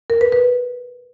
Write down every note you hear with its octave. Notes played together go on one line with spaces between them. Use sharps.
A#4
B4
B4